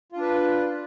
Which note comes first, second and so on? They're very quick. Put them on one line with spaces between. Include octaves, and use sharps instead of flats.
F4 D4 B4